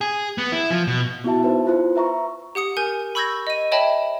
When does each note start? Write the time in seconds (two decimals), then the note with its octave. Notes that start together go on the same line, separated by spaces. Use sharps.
0.01 G#4
0.38 B3
0.52 E4
0.70 F3
0.87 B2
1.24 B3 E4 F#4 E5 A5
1.43 D#4 B4 C5
1.65 E4 F4 C5
1.95 B4 E5 A#5 C#6
2.55 G4 F#5 D#6 C#7
2.77 A#4 G#5 G6 D#7
3.15 B5 C#6 E6 G6 G#6 A#6
3.47 D#5 D#7
3.72 C#5 D#5 E5 G5 A5 B5